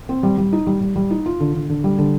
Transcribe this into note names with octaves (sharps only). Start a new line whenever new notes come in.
C4
G3
G3
D#4
G3
G3
G3
D#4
F4
D3
D3
D3
G3
D3